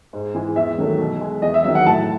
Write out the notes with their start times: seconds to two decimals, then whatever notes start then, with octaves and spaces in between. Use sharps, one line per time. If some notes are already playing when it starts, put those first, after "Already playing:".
0.13 G#2
0.34 E3 G#3
0.56 E2 E5
0.78 D#3 F#3 A3
0.99 B2
1.21 G#3
1.42 E2 D#5
1.54 E5
1.64 D#3 F#3 E5
1.75 F#5
1.85 A2 A5